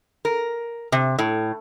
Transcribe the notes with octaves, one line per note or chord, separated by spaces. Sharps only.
A#4
C3
A2